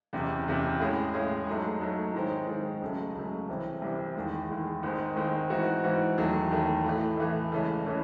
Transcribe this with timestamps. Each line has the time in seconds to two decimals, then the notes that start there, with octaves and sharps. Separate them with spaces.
0.13 F#1 E2 C3
0.47 F#1 E2 C3
0.80 A2 G#3 C#4 G#4
1.14 A2 G#3 C#4 G#4
1.47 G#2 F#3 A3
1.81 G#2 F#3 A3
2.14 G#2 D#3 G#3 C4
2.48 G#2 D#3 G#3 C4
2.81 C#2 C#3 F#3 A3
3.14 C#2 C#3 F#3 A3
3.48 C2 C3 E3 C4
3.82 C2 C3 E3 C4
4.15 E2 D#3 G#3
4.50 E2 D#3 G#3
4.83 G#1 G#2 D#3 G#3 C4
5.16 G#1 G#2 D#3 G#3 C4
5.50 G#2 E3 C4 F#4
5.83 G#2 E3 C4 F#4
6.17 E2 D#3 F#3 A3
6.51 E2 D#3 F#3 A3
6.84 A2 E3 A3
7.17 A2 E3 A3
7.52 C#2 C#3 E3 A3 C#4
7.86 C#3 E3 A3 C#4